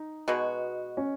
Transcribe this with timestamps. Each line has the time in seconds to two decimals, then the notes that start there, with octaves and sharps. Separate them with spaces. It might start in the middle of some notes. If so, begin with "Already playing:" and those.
Already playing: D#4
0.28 B2 G#3 B3 F#4
0.97 C#4